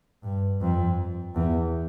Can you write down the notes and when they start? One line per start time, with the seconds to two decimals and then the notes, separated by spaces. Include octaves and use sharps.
0.23 G2
0.61 F2
1.36 E2